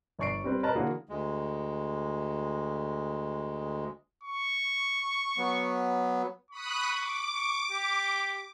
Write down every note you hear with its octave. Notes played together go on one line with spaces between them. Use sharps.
G1 C#5 D5 C#6 C7 D7
G3 C4 B4
A#4 B4 C#5 D#5 A5 A#5
D3 E3 A#3 F#4 G#4
D2 G#3
C#6
F#3 B3
B5 C#6 D#6 F#6
D6
C#6
G4